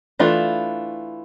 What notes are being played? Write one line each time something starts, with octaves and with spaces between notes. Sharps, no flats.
E3 A3 D4 F4